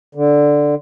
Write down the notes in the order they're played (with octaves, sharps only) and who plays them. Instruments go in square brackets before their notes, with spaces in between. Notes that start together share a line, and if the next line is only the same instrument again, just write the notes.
[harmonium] D3